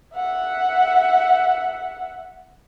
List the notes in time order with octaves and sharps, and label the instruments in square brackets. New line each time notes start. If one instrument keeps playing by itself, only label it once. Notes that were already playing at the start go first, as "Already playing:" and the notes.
[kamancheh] E5 F#5